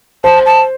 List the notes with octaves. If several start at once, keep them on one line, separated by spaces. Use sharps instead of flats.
C5 A5
A5